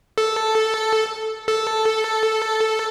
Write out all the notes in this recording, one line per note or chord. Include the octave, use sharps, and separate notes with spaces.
A4
A4